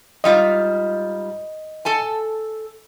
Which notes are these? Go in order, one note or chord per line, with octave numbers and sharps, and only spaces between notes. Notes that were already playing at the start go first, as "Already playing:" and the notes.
G#2 G3 F4 D#5
A4 G#5 A5